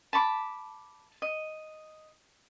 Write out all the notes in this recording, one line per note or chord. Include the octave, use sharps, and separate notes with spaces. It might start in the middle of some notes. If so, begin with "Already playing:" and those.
A5 B5 C#6 D6
D#5